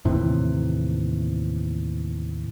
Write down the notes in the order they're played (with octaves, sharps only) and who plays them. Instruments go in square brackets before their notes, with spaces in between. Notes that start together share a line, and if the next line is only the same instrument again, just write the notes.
[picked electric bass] D#2 A2 C3 E3